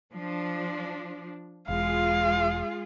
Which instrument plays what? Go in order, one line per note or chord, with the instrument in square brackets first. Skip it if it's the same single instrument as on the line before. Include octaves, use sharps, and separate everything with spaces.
[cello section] F3 D4
[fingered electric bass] E1 [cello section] G#3 F4 G#4 [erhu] F5